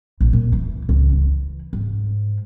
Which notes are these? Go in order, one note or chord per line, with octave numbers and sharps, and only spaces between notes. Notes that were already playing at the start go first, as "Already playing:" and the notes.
A#1
A#2
E3
C#2
E3
G#2